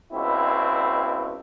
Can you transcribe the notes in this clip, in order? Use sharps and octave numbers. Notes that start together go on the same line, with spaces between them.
C#2 B2 C4 E4